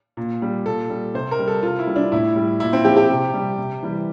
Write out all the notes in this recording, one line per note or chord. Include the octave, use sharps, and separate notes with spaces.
A#2
G3
A#2 A4
G3
C3 C5
A#4
G3
A4
C3 F4
E4
G3
D4
A2 E4
G3
A#2 E4
C4
F3 G4
G4
C3
G3
C3
E3 G3